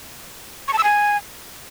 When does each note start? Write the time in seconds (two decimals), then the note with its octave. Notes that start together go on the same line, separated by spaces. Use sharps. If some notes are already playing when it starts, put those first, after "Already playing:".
0.68 C#6
0.73 A5
0.78 E6
0.84 G#5